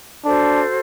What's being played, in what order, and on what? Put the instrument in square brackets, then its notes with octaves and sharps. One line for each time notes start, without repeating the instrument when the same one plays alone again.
[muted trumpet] D4 [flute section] F#4 A4 C5